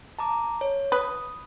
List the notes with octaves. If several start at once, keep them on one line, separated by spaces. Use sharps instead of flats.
A5 A#5 D6
C#5
B4 D#6